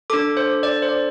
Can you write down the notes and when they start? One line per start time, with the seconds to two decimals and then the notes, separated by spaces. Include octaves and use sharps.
0.10 D4 A4 D6
0.37 C5
0.63 D5
0.82 C5
0.89 D5